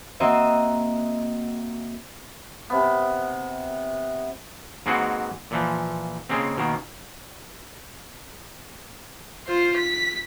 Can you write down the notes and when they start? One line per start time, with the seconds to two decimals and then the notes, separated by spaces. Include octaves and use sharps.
0.20 A#3 C4 F#4 D#5 E5
2.70 C3 B3
4.86 G#2 G#3 A#3 C4 F#4 B4
5.51 A#2 E3 F3
6.29 C#3 G#3 A#3 C4
6.57 B2 D#3 A#3
9.47 F4 C5
9.77 B6